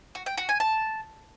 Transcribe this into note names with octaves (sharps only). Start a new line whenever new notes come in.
F#4
G5
F#4
G#5
A5